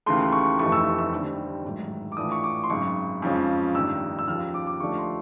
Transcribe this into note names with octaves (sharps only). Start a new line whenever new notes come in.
D#2 C#3 E3 A3 C6
C#6
F1 F2 C3 E3 A3 C#6
E6
E6
D#2 D3 G3 C4
A1 G#2 D#3 F#3
D6
A2 E3 A3 D4 F4 D#6
C#6
D6
C6
G#1 F#2 C#3 C#6
F2 C#3 F3 G#3 C#4
A1 G2 D#3 E6
E6
D#2 C#3 F3 F6
E6
D6
D6
D#2 D3 F3 A3 D4 C#6
C6